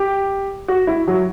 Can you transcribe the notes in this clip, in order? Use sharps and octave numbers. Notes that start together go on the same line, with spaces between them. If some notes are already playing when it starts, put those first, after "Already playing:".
Already playing: G4
F#4
E4
F#3